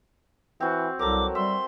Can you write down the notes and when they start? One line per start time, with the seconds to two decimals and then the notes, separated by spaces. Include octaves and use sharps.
0.60 E3 C4 F#4
0.99 C2 F#3 A4 A#4 D6
1.35 G3 E5 C6